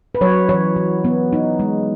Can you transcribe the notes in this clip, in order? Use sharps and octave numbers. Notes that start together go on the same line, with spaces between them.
B4
F#3 C#5
E3 C#5
E3
B3
D#4
G#3